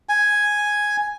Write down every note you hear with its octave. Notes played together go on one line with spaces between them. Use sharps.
G#5